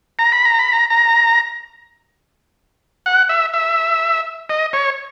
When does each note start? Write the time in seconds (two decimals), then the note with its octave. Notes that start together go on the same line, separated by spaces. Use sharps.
0.19 A#5
0.32 B5
0.45 A#5
0.59 B5
0.72 A#5
0.90 A#5
3.06 F#5
3.29 E5
3.54 E5
4.50 D#5
4.73 C#5